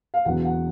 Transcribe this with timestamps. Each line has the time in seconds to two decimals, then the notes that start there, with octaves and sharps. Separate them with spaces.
0.14 F5
0.25 E1 E2 C#3 F#3 F#5
0.45 F#5